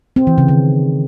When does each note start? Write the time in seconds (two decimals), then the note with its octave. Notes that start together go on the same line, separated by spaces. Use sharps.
0.16 C4
0.27 E3
0.38 C#3
0.48 D#3